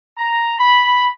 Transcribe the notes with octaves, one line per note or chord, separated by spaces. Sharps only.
A#5
B5